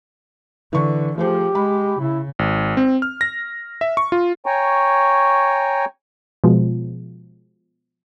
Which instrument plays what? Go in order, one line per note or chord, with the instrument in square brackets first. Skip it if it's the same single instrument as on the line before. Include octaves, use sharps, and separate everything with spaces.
[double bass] D3 [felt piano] E3 C#6
[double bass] F3 [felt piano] A3 G#4 C5 [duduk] G4
[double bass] G#3 [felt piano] B5
[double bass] C#3 [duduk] E4
[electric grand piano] G#1
C4
F6
A#6
E5
C#6
F4
[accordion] C#5 G5 G#5 A#5 C#6
[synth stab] B2 F3 G#3